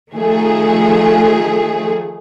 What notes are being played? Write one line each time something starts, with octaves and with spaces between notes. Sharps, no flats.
D#3 F3 A3 G#4